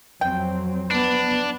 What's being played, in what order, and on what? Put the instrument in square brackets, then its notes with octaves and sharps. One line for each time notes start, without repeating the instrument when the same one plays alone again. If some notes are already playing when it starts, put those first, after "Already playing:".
[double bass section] F2 F#3 C4 [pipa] G5
[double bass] B3 [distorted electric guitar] D4